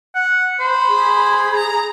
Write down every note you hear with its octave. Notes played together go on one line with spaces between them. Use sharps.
F#5
C5 B5
G#4
A#5